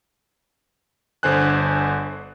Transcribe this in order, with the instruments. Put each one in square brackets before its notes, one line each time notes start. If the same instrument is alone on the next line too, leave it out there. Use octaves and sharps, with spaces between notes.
[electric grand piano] G1 D3 C5 G#5 F#6